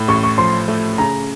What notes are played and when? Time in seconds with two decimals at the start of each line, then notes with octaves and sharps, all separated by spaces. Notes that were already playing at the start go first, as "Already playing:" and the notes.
Already playing: A2
0.08 A1 C#6
0.23 C#6
0.38 F3 C6
0.68 A3
0.98 C#3 A#5